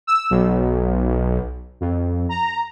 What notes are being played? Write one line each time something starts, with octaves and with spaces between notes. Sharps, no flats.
E6
B1
F2
A#5